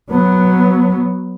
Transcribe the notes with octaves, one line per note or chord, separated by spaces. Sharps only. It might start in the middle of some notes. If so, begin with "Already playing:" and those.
F#3 B3